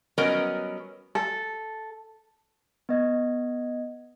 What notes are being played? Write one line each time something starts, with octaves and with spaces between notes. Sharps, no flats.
F#3 G3 B3 C#4 A#4 D#5
A4
B3 D#5 G#6